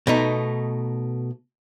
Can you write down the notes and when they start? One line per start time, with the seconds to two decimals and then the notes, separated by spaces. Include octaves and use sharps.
0.07 B2 A3 D#4